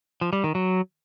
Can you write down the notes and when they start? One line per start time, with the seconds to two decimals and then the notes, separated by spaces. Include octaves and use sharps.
0.21 F3
0.33 G3
0.44 D#3
0.55 F#3